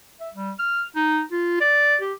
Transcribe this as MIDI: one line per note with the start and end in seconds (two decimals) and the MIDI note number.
0.20 0.29 76
0.34 0.51 55
0.59 0.83 89
0.96 1.20 63
1.32 1.60 65
1.61 1.96 74
2.01 2.12 67